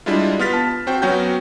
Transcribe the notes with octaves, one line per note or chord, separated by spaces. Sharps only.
G3 G#3 D4 E4 F4
B3 F4 F6 A6 B6
A5
C4 F#4 C5 G5
F#3 B3 C#4 F#4 G5 G6